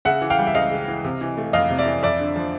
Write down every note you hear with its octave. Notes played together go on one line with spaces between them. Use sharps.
C#3 E5 F#5
E3
F5 G5
G3
E5
C#2 D#5 F5
C#3
E3
C3
E3
A3
F2 D#5 F5
C3
D5 E5
E3
F2 D5 E5
D3
F3